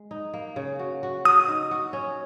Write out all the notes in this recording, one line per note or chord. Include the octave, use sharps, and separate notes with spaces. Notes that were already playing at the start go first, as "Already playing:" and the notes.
Already playing: G#3
D#4
A#3
C#3
F#4
F#4
F#4 D#6
D#4
F#4
C#4